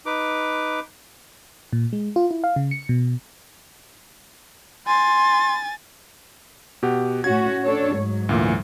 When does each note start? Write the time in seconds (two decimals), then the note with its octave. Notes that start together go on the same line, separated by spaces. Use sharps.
0.06 D#4 B4 D6
1.73 A#2
1.93 G#3
2.16 F4
2.31 E4
2.44 F5
2.56 C#3
2.71 C#7
2.89 B2
4.87 G#5 C6 A6
6.83 B2 G4 F#5
7.24 A2 C#4 F#4 G#6
7.64 D4 A4 C#5
7.96 G#2 F#3
8.29 D2 A#2 E3